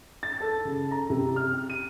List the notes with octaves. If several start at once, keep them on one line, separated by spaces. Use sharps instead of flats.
A6
A4
C#3
A#5
C3
F6
D#7